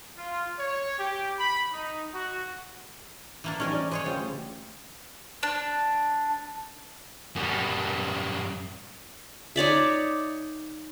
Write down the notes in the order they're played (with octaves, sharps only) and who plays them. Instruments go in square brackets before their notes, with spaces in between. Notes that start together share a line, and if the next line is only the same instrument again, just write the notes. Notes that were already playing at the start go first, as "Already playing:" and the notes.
[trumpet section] F4
C#5
G4
B5
D#4
F#4
[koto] E3 A#3 D4
[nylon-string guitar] F3 G3 D#4 [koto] C#4 A#4 G#5
[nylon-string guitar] D5
[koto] G#3 G#4 C#5 [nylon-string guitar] C5
[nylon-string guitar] C#3 F4 C5 [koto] G3
[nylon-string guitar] D2
[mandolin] D4
[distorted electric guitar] F#2 G3
[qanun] D#4 C#5 D5 E5